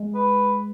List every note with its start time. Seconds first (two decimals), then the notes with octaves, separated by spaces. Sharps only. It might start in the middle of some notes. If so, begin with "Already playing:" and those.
Already playing: G#3
0.15 B4